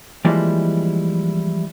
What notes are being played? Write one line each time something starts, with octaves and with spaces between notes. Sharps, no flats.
E3 F3 G3 G#3 A#3 E4